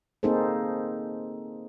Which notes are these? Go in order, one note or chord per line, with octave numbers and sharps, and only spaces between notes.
A#3 C4 D#4 G#4 A4 C5